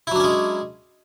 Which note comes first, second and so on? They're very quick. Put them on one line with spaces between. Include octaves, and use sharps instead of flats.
E4 F#3 D4 C#4 G#3